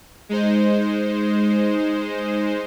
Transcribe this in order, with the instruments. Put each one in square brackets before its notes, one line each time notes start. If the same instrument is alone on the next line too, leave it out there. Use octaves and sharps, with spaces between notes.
[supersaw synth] G#3 D#4 C5